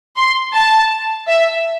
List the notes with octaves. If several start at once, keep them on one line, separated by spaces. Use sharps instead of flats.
C6
A5
E5